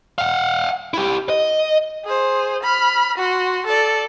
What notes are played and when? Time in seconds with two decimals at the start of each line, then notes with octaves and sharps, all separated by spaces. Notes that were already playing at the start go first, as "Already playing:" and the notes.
0.18 F5 F#5
0.94 E4 G4
1.29 D#5
2.04 G#4 C5
2.63 B5 F6
3.18 F#4 C6
3.66 A4 D5